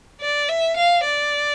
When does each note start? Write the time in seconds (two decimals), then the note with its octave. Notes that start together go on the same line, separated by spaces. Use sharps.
0.21 D5
0.49 E5
0.77 F5
1.04 D5